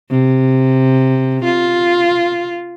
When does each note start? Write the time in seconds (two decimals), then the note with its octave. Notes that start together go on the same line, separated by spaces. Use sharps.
0.10 C3
1.44 F4